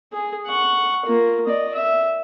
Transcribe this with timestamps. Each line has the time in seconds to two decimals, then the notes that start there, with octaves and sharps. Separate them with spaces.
0.13 G#4
0.47 F#5 C#6
1.06 A#3 F4
1.45 D5 D#5
1.75 E5